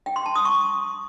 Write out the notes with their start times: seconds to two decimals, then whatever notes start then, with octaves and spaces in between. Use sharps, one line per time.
0.06 G5
0.16 C6
0.26 A5
0.35 D#6
0.45 C#6